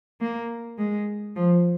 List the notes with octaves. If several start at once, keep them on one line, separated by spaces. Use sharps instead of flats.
A#3
G#3
F3